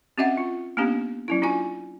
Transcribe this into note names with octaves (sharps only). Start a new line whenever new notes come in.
C4 C#4 F#4 D#5 E5 F#5
F4
A#3 B3 C#4 D4 G4
F#3 C#4 E4
D4 F4 F#4 G#5